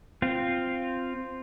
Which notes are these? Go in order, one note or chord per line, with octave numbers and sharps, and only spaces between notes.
C4 F4